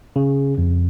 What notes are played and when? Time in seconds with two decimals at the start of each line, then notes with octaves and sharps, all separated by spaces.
0.16 C#3
0.58 F2